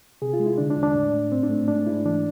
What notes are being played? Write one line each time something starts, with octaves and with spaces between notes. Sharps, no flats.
C3 G#4
F4
G#3
E4
D3 D4
D4
E2
D4
A2
A2
G#2 C4
D4
A3
G#2 D4
G#2 E4
E3 D4